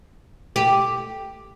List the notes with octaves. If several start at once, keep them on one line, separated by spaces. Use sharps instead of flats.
G4